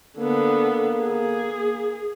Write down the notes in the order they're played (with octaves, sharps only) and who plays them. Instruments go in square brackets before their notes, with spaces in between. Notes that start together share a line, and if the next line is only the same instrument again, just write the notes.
[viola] D3 B3 [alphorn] A#3
[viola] G#4